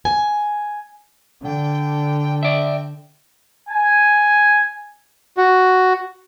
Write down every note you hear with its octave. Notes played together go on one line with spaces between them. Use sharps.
G#5
D3 G5
D5 E5 G5
G#5
F#4